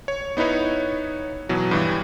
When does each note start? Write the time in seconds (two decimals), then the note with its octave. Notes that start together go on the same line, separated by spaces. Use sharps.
0.08 C#5
0.37 B3 D#4 E4 B4 C#5
1.49 B2 E3 F#3
1.71 G2 E3 G3